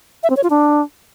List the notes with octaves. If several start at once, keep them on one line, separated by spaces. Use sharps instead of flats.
E5
C4
C#5
F4
D4